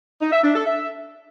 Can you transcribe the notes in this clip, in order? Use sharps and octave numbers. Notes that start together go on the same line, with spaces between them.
D#4
E5
D4
A4
E5